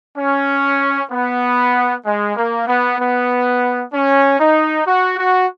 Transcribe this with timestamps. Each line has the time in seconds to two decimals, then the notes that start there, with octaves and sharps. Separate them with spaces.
0.18 C#4
1.11 B3
2.05 G#3
2.36 A#3
2.67 B3
2.99 B3
3.93 C#4
4.40 D#4
4.87 F#4
5.18 F#4